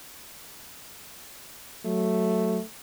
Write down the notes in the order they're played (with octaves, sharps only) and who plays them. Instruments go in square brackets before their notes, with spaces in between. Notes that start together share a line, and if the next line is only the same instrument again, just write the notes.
[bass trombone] F#3 [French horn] A3